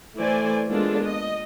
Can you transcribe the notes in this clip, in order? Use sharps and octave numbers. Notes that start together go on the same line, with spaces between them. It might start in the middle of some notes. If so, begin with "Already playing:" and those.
E3 A3 C5 D5 G#5
G#3 A#3 B3 D4 F4 A4
D#5